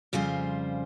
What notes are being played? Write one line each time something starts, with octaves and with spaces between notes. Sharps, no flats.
F2 C#3 G3 F4 C5 G#5